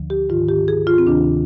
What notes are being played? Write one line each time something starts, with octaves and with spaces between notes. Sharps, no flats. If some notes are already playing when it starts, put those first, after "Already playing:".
Already playing: D2 D3 F3
G4
G#2 D#3 F4
G4
G#4
F4
C4
D2 C3 D#3 D4